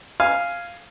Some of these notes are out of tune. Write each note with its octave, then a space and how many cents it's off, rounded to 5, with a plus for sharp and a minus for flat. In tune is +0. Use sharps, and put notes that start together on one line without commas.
F5 -5 G#5 +0